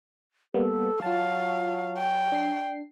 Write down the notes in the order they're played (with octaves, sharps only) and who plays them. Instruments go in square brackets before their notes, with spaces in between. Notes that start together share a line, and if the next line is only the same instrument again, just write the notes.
[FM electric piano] G3 A#3 B3 [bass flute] A4
[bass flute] F#3 [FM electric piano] F4 A5 [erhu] F5
[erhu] G5
[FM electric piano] D4 C7